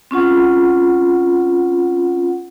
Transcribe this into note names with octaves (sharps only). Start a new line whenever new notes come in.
C4 C#4 F4 F#5